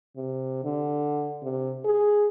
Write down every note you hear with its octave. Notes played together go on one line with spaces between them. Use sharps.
C3
D3
C3
G#4